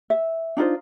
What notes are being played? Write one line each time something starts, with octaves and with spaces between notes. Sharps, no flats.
E5
D4 D#4 F4 C5